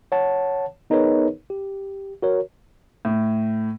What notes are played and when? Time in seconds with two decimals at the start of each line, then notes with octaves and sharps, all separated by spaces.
0.12 C#5 F#5 A5
0.90 B3 D#4 G#4 A#4 B4 C#5
1.50 G4
2.22 F#4 A#4 C#5
3.05 A2